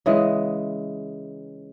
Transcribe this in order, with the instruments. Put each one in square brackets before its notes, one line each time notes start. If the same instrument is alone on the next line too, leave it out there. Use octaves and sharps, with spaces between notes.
[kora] C#3 E3 G#3